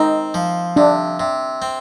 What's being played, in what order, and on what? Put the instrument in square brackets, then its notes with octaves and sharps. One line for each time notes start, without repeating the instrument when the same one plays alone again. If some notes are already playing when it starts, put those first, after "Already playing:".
Already playing: [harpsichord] C4 [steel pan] D#4
[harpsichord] F3
[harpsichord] C3 [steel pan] D4
[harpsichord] C3
C4